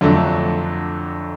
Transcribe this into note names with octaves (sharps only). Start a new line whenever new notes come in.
F2 D3 F#3 A3 D4